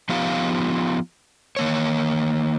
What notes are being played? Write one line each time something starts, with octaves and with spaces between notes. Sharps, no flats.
F3 B3 D#4 F4 G4 F5
D#3 A#3 C#5